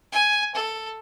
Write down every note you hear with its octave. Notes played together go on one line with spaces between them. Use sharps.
G#5
A4